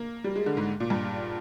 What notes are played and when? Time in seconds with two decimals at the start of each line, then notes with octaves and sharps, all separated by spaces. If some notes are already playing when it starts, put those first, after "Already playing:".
Already playing: A#3
0.24 G3
0.36 G#3
0.46 D3
0.57 G#2
0.80 A#2
0.90 G2